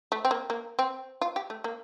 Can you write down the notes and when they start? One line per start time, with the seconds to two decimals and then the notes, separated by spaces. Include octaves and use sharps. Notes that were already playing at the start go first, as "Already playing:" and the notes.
0.12 A3
0.25 C4
0.31 A#3
0.50 A#3
0.79 C4
1.21 F4
1.36 G4
1.50 A3
1.64 A#3